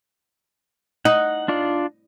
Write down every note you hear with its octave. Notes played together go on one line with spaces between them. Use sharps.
D#4 F#5
D4 F4 D5